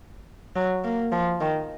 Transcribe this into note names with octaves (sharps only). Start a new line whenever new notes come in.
F#3
A#3
F3
D#3